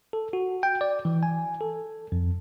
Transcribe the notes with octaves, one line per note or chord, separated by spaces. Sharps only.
A4
F#4
G5
D5
E3
G#5
A4
F2